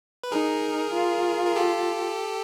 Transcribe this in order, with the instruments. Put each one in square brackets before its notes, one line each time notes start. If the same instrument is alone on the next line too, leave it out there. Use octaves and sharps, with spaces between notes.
[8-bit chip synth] B4
[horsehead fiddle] D#4 [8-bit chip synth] G#4 A#4
[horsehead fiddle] F4
[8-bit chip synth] A#4
G4 A4